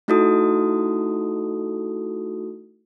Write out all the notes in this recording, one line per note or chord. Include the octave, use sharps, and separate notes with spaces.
A3 D#4 E4 F#4 A4 D#6